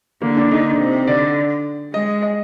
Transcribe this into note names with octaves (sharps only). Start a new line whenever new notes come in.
D3 A#3
D4
D3 D#4
C3
D3 D5
G#3 D#5
D#5